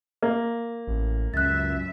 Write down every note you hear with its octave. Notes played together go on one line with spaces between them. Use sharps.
A#3
A1
C#2 F#2 E5 F#6 A6